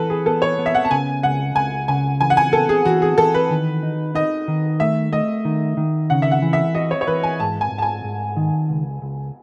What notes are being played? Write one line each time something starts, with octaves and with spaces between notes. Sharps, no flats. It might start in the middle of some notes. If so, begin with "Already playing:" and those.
Already playing: E3 F#4 A4 B4
G#4
B3 A4
C#5
B3
E5
F#5
A5
C#3 G#5
C#2 F#5
C#2 G#5
C#3 G#5
E3 G#5
F#5
G#5
B3 A4
G#4
E3 F#4
G#4
E3 A4
B4
D#3
D#4
D#4 D#5
D#3
A3 E5
A3 D#5
D#3
D#3
C#3 F#5
E5
F#5
E3
E5
F#4 D#5
C#5
C#5
E3 B4
G#5
G#2 A5
G#5
G#2
A5
G#5
G#2
D#3
C#2
C#2